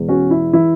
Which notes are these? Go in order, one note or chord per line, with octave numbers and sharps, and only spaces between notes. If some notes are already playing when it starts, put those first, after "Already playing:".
Already playing: E1 E2 E3
C#4 F#4
E4
E3 E4